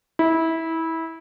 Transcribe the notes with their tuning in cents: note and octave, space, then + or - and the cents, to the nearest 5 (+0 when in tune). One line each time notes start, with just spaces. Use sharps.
E4 -20